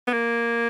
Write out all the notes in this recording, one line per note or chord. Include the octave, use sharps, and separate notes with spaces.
B3
A#3